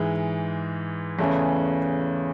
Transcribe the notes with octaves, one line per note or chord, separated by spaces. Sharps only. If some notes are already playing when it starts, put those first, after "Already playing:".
Already playing: G#2 E3 G#3
E2 C#3 E3 A3 C#4